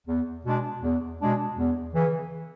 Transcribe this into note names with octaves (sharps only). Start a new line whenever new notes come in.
E2
B2 G#3 D4
E2
B2 G#3 D4
E2
C#3 E3